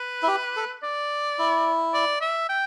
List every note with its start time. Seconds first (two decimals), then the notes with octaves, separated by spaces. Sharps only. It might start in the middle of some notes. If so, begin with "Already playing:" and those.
Already playing: B4
0.23 E4
0.28 G4
0.56 A4
0.83 D5
1.39 E4
1.94 D5
2.21 E5
2.49 G5